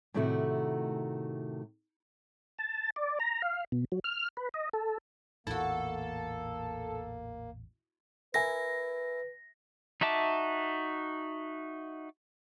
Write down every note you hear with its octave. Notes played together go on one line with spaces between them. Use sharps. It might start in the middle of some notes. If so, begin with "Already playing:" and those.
A2 C3 D#3 A3 F#4
A5
D5
A#5
F5
B2
F#3
F6
B4
D#5
A4
A1 E2 A#2 A#3 E4 F#4 A4
E4 A#4 B4 G#5 A#6
D#4 F#4 E5 A5 D6